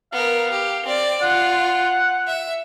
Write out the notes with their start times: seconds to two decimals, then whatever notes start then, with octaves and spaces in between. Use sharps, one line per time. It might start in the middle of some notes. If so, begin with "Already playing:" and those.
0.13 B3 A#4 F5
0.50 G4
0.83 C4 D5
1.22 F4 F#5
2.27 E5